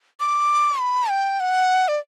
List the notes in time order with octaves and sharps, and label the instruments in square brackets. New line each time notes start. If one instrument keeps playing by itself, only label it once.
[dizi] D6
B5
G5
F#5
D5